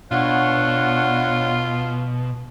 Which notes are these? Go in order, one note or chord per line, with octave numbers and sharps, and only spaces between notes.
B2 D4 F4 C#5 F#5